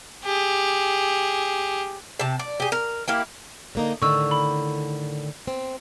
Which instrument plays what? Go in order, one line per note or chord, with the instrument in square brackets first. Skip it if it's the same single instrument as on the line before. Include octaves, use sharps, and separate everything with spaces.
[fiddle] G4 G#4
[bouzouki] C3 A5
D5
G4 G#4
A#4
A#3 E4 G4
[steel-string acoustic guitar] D3 A#3 D#4
[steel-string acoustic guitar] A2 D3 D#3 [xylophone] C#6 E6
[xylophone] B5
[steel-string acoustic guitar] C4